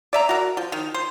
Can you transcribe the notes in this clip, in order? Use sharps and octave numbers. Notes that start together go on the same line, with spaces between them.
D5 E5 A#5
F#4 A#4
F3
D#3
C5